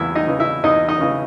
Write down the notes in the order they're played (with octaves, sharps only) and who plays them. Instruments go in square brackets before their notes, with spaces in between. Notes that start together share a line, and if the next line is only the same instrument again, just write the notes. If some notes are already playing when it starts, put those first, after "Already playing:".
Already playing: [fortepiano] E2 E4 E5
D#4 D#5
C#3 E3
E4 E5
E2 D#4 D#5
D#4 D#5
C#3 E3